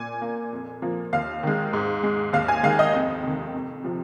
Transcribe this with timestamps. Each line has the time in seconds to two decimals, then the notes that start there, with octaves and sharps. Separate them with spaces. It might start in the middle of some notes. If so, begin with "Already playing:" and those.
Already playing: A#2 G#5
0.22 A#3
0.53 F2
0.82 F3 A#3
1.13 D#2 F5
1.43 D#3 G#3
1.73 G#2
2.03 G#3
2.33 D#2 F5
2.48 G#5
2.63 D#3 G#3 F5
2.79 D#5
2.94 F2
3.23 C3 D#3
3.53 F2
3.84 C3 F3